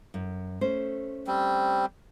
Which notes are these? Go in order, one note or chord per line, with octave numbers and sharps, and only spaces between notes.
F#2
A3 C#4 C5
G3 C4